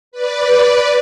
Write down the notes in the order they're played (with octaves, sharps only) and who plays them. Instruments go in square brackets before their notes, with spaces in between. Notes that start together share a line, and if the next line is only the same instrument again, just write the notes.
[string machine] B4 D5